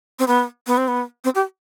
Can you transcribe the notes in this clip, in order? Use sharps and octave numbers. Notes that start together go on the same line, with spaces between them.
C4
B3
B3
C4
B3
C4
G4